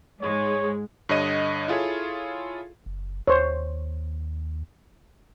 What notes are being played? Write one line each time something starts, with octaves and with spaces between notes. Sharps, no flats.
G#2 G#3 C#5
G2 D3 C#5 D#5 D#7
E4 F4 G#4 A4 C#5
F#1
D#2 C5 C#5